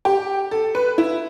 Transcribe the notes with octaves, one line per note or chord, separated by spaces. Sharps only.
G4
A4
B4
E4